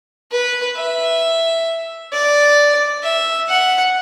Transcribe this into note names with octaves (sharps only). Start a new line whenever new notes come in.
B4
E5
D5
E5
F#5